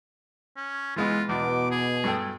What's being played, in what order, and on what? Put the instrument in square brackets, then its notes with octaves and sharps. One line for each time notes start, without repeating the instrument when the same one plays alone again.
[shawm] C#4
[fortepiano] E3 G#3 B3 [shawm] F4
[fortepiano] E2 [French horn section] B2 [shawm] D6
[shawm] G#4
[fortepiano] G2 A4 G5